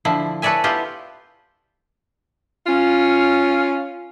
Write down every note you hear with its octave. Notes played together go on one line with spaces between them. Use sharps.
D3 F3 E4
A4 B4 C#5 D5 E5 G#5
B3 E4 F4 G4
C#4 F4